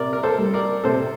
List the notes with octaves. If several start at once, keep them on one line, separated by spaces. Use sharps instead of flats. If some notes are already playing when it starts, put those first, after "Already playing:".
Already playing: C3 A#4 D5
A#4
A4 C5
G3
A#4 D5
C3 A4 C5